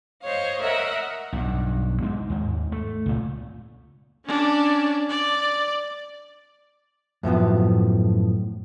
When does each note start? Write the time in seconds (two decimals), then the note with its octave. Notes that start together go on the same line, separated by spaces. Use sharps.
0.22 C5 C#5 D#5 F5
0.62 A#4 D#5 E5 F#5
1.33 B1 G2
2.03 G#2 G#3
2.30 D#2 G#2
2.72 A3
3.06 C#2 A#2
4.25 C#4 D4
5.10 D5
7.23 F#2 A2 F3 B3